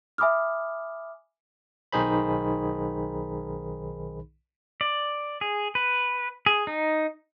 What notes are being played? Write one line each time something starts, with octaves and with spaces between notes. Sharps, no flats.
E5 G#5 B5 D6 D#6 F6
B1 D#3 D#4 G#4 C5 B5
D5
G#4
B4
G#4
D#4